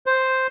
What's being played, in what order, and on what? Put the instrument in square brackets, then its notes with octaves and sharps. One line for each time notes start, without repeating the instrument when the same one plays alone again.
[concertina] C5